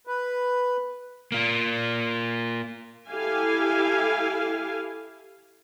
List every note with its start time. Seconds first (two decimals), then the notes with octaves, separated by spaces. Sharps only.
0.07 B4
1.32 A#3 F4
3.09 E4 G4 A4 F5 G#5